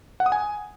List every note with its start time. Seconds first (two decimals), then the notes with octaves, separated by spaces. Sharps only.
0.20 F#5
0.26 D#6
0.32 G#5